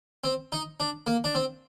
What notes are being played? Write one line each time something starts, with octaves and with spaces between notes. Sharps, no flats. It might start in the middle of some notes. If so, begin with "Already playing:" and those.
C4
D#4
D4
A#3
D4
C4